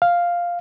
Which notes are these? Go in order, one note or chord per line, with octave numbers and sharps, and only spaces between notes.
F5